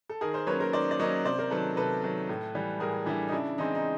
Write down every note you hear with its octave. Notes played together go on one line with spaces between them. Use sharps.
A4
D#3 G#4 A#4
A#4 C5
F#3 A#3 C#4 B4 C#5
A#4 C5
D#3 C5 D5
D5
F#3 A#3 C#4 C#5 D#5
C3 C5 D5
A#4 C5
D#3 F#3 A4 B4
C3 A4 B4
D#3 F#3
A2
E3 G3
A2 G#4 A#4
E3 G3 D4 E4
D#4
C#3 D4 E4
E3 G#3 C4 D#4
D#4